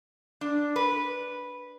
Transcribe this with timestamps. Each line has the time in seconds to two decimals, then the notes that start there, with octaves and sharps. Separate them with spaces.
0.41 D4
0.76 B4